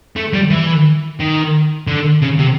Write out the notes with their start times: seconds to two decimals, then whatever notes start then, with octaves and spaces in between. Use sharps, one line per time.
0.16 A3
0.34 G3
0.50 E3
1.20 D#3
1.87 D3
2.22 C#3
2.39 C3